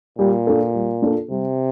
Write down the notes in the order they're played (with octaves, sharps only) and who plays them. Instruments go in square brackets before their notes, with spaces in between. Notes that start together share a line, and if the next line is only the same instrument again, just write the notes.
[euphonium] A#2 [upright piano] G3
[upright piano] A#3 D4 F4 A4
G3
A#3 D4 F4 A4
[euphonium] C3 [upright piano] G3